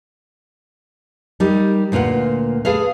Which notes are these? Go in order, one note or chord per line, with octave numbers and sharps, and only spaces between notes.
G3 D#4 G4 A#4
D2 A#2 F4 B4 F#5
G#4 A4 B4 F5